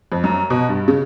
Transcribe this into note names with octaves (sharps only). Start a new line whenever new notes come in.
F2
F#2
B2
G2
C#3